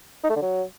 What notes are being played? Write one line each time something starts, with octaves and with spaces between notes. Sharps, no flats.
D#4
A3
D3
F#3